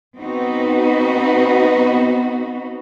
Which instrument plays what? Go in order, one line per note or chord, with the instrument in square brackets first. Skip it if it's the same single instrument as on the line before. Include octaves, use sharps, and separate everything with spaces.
[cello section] B3 C4 D#4 F#4 B4